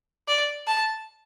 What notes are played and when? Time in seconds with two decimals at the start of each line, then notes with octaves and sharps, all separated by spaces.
0.28 D5
0.67 A5